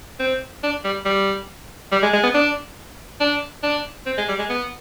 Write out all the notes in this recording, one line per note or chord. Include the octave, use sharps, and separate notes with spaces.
C4
D4
G3
G3
G3
G#3
G#3
B3
D4
D4
D4
C4
G#3
G3
G#3
B3